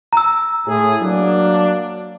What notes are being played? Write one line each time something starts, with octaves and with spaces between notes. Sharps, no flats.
A#5 E6
A2 G#4
F#3 A#3 D4